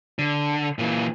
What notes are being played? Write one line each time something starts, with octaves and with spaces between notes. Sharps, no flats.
D3
A#2 E3